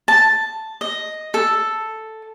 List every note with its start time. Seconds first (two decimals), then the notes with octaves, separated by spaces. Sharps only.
0.08 A5
0.81 D#5
1.34 A4